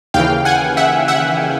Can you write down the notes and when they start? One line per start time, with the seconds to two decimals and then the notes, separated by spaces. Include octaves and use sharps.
0.14 D#2 C#3 E3 F5 G5
0.45 F#5 G#5
0.77 E5 F#5
1.08 E5 F#5